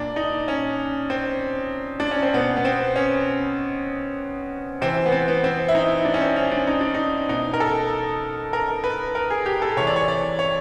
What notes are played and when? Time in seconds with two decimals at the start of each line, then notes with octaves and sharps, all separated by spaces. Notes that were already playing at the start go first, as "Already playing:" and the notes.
Already playing: A#2 D4
0.16 D#4
0.48 C#4
1.10 C4
2.00 D4
2.11 C#4
2.22 C4
2.34 B2 B3
2.57 B3
2.65 C4
2.96 C#4
4.81 C3 E3 C4
5.06 B3
5.12 C4
5.28 B3
5.44 C4
5.68 E4
5.75 D#4
6.05 D4
6.14 C#4
6.21 C4
6.36 C#4
6.51 D4
6.67 D#4
6.81 D4
6.94 D#4
7.29 B2 D#4
7.54 A#4
7.60 A4
8.53 A#4
8.84 B4
9.15 A#4
9.30 G#4
9.46 G4
9.62 A4
9.77 C3 E3 C#5
9.87 D5
9.96 C#5
10.08 D5
10.39 C#5